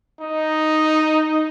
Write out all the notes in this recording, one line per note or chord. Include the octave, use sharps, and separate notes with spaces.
D#4